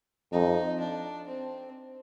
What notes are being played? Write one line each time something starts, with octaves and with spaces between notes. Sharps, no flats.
F2 D#4
D4
C4